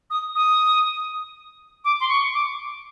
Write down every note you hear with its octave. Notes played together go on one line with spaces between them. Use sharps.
D#6
D#6
D6
C6
C#6
D6